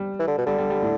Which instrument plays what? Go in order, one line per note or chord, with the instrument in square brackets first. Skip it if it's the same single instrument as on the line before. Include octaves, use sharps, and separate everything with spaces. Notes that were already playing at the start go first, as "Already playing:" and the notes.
Already playing: [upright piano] G3
[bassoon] E3
D3
B2
[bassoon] D3 [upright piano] G3
[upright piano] G3
G3
A2